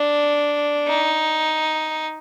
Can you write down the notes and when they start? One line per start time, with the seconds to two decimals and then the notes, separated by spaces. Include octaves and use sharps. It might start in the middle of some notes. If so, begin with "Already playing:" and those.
Already playing: D4
0.88 D#4